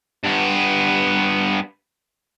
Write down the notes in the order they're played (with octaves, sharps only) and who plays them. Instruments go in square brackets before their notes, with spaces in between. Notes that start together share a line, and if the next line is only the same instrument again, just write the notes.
[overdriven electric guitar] G2 B3